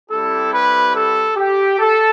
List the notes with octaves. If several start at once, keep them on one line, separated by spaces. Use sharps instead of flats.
G3 C4 E4 G4 A4
B4
A4
G4
A4